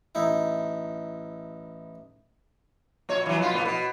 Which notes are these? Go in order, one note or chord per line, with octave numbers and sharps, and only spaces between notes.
A1 D#4 E4
A#2 C#5
E3 F#3
B2 F4
A2 B3
B2